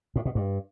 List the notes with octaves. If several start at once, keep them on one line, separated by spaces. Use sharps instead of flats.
A2
B2
G2